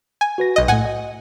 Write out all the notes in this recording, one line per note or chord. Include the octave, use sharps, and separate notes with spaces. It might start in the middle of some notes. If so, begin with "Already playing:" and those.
G#5
F#4 B4 A#6
B1 D#5
A2 A3 F#5 G#5
D#5